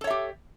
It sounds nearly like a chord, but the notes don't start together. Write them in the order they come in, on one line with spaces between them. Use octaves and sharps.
A4 C#5 E5 G4